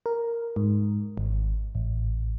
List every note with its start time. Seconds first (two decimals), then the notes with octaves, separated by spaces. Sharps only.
0.06 A#4
0.56 G#2
1.18 G#1
1.75 A1